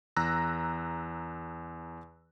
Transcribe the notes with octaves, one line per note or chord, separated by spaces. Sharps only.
E2 A#5 E6 F#6 A#6